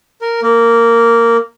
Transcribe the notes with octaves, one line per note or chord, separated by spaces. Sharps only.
A#4
A#3